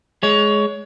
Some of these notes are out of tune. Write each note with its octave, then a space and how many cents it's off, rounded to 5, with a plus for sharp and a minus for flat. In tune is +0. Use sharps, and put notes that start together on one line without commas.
G#3 +15 C#5 +20